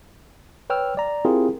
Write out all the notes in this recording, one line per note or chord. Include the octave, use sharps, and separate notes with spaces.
B4 C#5 G5 E6 F6
D5 A#5
C4 E4 F4 G4 G#4 A#4